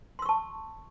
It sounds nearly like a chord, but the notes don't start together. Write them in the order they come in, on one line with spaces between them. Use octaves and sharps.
C6 E6 C#6 A5